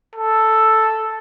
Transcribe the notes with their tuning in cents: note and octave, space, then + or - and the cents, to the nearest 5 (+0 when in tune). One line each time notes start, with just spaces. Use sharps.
A4 +0